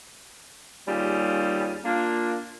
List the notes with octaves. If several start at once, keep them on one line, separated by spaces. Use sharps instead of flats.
D#2 G3 C#4 F4 G4 G#4
A#3 D4 F4